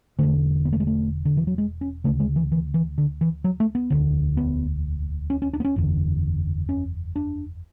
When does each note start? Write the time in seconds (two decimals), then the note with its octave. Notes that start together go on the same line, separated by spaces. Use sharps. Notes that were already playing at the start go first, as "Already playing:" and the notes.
0.19 E1 E2 D3 A3
0.65 B3
0.73 A3
0.80 G#3
0.87 A3
1.25 D3
1.37 E3
1.47 F#3
1.58 G#3
1.81 C#4
2.04 D2 C#3 A3
2.20 G#3
2.36 E3
2.52 E3
2.74 E3
2.98 D3
3.21 E3
3.44 F#3
3.60 A3
3.75 B3
3.90 E1 D2 D3
4.37 B3
5.30 C#4
5.42 C#4
5.53 D4
5.60 B3
5.65 C#4
5.76 F#1 E2 D3
6.69 C#4
7.16 D4